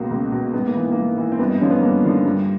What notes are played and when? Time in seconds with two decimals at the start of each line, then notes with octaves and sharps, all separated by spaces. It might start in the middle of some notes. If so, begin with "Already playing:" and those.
Already playing: C#2 B2 A#3
0.10 C#2
0.32 B2
0.53 G#2 B3
0.66 A#3
0.75 E3
0.91 A#3
0.96 G#2
1.18 E3
1.32 C4
1.39 G2 B3
1.50 D#4
1.60 D3 F3 C#4
1.71 B3
1.81 G2 A#3
2.04 D3 F3
2.25 G2